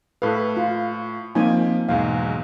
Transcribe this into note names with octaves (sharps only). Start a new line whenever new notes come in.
A2 A4 B4 F5
F4
F3 A#3 C4 D#4 G#5
B1 E2 G#2 F5